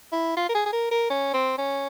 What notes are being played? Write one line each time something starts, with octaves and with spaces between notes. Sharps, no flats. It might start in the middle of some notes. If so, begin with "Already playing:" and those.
E4
F4
A#4
G#4
G#4
A#4
A#4
C#4
C4
C#4